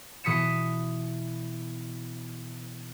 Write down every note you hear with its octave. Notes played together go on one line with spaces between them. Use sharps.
B2 E3 D#6 B6 C#7 E7